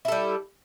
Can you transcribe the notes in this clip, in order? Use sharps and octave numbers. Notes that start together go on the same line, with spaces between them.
G3 E4 A4